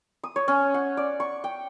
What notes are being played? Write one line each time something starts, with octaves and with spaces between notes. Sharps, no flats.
D#6
C#5
C#4
F#5
D5
C#6
G5